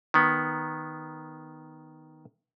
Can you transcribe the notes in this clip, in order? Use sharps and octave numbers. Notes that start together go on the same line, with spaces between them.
D#3 B3